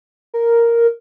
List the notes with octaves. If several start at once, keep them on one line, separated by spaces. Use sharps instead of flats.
A#4